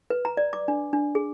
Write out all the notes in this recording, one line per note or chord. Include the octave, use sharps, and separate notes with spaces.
B4
A#5
D5
D6
D4
D4
G#4